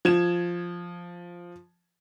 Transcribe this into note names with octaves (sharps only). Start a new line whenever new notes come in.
F3 G#6 E7